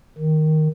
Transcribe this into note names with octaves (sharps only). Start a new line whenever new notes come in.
D#3